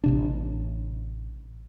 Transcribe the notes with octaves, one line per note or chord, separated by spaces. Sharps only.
A1 C3 D4